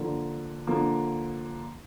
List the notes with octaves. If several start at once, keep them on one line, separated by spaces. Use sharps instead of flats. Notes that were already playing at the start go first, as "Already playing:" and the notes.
Already playing: D3 F3 A#3
D3 F3 A#3